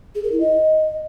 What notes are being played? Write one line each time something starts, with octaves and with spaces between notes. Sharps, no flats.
G#4
A#4
E4
D#5